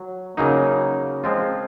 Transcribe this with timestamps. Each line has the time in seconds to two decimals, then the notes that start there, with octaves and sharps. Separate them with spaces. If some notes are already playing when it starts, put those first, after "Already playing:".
Already playing: F#3
0.37 C#3 F#3 A#3 D#4
1.24 F3 G#3 C4 F4